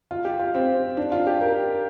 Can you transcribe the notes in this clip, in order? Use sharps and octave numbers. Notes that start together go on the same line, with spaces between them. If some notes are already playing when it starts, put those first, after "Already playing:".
F4
G4
F4
C4
D4
F4
G4
A#4